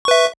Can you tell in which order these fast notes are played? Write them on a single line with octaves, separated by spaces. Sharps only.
C#6 B4 E5